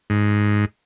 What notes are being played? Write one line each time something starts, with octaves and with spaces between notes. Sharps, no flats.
G#2